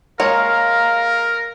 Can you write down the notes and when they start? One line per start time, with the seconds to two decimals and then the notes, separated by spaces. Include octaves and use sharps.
0.20 G#3 A#3 A#4 C#5 F5 A#5